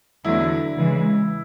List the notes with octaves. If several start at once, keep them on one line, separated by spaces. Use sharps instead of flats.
E2 D3 F#3 A3 E4
C#3 E3 G#3